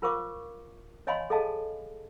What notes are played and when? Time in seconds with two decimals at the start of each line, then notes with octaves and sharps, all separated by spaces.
0.02 F4 A#4 C5 F5 C#6 D6
1.07 C#5 D#5 F5 G#5 B5 C6
1.30 G#4 A4 D#5 F5 G#5 A5